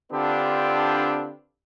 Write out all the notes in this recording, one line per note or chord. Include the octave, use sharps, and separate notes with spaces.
D3 C4 D4 F4 G4 B4